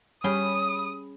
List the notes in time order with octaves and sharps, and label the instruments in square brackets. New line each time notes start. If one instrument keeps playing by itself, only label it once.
[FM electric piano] G3 B5 [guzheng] C#4 G#4 G5 [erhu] D#6